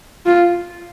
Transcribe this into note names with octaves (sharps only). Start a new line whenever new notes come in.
F4